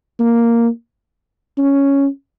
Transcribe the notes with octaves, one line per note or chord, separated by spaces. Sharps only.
A#3
C#4